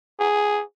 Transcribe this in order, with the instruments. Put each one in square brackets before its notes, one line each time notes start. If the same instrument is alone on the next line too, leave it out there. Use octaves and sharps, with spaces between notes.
[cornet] G#4